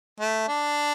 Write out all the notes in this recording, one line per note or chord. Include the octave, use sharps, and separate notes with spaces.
A3
D4